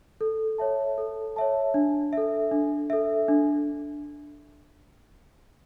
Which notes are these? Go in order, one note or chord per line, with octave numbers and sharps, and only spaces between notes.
A4
C#5 E5 A5
A4
C#5 E5 A5
D4
A4 E5
D4
A4 E5
D4